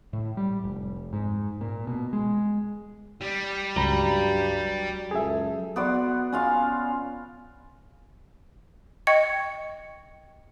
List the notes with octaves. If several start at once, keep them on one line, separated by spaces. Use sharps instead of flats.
A2
G3
F1
G#2
A#2
B2
G#3
G3
C#2 G2 F#3 A#5 B5
C#2 F#2 G#4 A4 E5
B3 F#4 D5 C6
C#4 F4 F5
D#5 G5 C#6 G#6 C#7